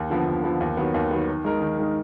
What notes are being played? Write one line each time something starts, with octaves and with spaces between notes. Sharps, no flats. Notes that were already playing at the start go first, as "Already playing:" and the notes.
Already playing: D#2
D3 F3 B3
D#2
D3 F3 B3
D#2
D#3 F#3 B3
D#2
D#3 F#3 B3
D#3
G#3 D#4 A#4
D#3
G#3 D#4 A#4